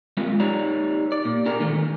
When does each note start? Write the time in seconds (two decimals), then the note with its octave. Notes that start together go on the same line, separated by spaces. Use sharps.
0.17 G3 G#3 A#3 C4 F4
0.40 D#4 G4 C#5 D5 A#5
1.12 D5
1.25 A#2
1.46 D4 G#4 A#4
1.60 D#3 E3 A3